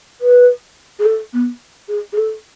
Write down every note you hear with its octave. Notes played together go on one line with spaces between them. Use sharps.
B4
G#4
A4
B3
G#4
G#4
A4